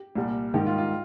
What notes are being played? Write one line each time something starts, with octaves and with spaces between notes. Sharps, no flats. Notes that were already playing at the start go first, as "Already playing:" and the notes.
Already playing: G4
C2 A#2 G3
G#2 D#3 G3 G4
F4
F4